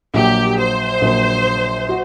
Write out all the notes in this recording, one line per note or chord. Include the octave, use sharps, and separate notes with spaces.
A#1 A#2 F#3 G4
C5
A#1 A#2 F#3
F#4